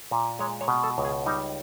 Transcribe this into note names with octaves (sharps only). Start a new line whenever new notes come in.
A#2
G#3 C#5
C#5
B2
A4
C#2
G#4
G3 D#4